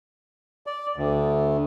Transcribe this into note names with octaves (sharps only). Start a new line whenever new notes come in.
D5
D2